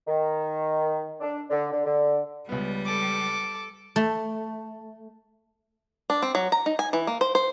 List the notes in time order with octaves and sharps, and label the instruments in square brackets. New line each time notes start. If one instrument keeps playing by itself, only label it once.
[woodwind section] D#3
D4
D3
D3
D3
[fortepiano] C#2 B3 [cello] G3
[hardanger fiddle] A4 D6
[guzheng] A3
[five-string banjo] D4
C4
F#3
A#5
D#4
G#5
E3
A#3
C5
C5